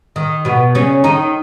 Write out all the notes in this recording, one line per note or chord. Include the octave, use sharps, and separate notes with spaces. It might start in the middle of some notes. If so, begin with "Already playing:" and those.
D#3
B2 B3
C#3 C#4
D#3 D#4